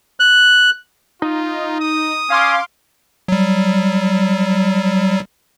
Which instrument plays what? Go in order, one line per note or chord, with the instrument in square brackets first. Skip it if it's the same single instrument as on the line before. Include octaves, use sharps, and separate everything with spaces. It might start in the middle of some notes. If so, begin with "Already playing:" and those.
[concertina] F#6
[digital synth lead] D#4 [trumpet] F4
[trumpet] D#6
[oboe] C#4 [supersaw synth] F5 C6 D6
[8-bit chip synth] F#3 G3